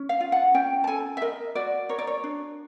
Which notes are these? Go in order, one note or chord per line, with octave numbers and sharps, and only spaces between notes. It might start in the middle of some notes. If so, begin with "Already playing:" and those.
Already playing: C#4
F5
F4
F#5
C#4 G5
A5
A4 G#5
E5
A#4 D#5
F#4 D5
A#4 C#5
D5
C#5
D4